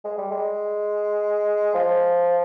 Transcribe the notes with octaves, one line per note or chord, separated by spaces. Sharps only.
G#3
G3
G#3
F3